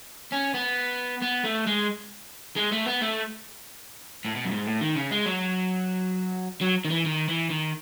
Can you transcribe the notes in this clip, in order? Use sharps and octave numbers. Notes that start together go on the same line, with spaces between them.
C#4
B3
B3
A3
G#3
G#3
A3
B3
A3
A2
B2
F#2
G#2
A2
D#3
C#3
G#3
F#3
F#3
D#3
E3
D#3
E3
D#3